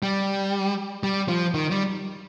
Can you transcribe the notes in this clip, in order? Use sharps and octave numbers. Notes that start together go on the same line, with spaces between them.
G3
G3
F3
D#3
G3